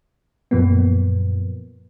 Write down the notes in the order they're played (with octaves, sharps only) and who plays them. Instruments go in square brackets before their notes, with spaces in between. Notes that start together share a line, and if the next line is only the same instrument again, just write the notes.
[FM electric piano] F#2 A#2 F3 A#3 B3